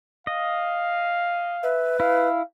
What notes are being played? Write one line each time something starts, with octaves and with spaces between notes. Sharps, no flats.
D#5 F5
B4 E5
E4 F5